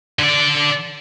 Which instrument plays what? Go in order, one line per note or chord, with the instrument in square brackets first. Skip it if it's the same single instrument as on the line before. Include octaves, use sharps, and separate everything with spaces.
[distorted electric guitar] D3 D5